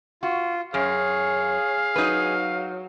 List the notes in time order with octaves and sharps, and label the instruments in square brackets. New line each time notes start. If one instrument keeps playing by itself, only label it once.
[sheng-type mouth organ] F4 [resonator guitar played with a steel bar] F#4
[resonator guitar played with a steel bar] F#2 [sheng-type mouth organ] G#4 [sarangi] C#5 [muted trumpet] F5
[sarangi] F#3 [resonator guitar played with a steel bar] D#4 B4